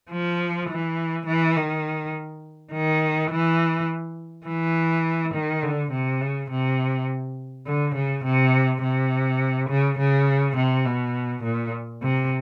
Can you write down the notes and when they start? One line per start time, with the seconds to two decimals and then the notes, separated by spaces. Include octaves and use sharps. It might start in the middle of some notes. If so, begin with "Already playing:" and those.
0.11 F3
0.70 E3
1.27 E3
1.56 D#3
2.72 D#3
3.31 E3
4.47 E3
5.34 D#3
5.63 D3
5.92 C3
6.21 C#3
6.51 C3
7.66 D3
7.95 C#3
8.25 C3
8.83 C3
9.69 C#3
9.99 C#3
10.57 C3
10.86 B2
11.44 A#2
12.03 C3